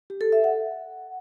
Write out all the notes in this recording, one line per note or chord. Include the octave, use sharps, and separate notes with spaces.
G4
A4
E5
F#5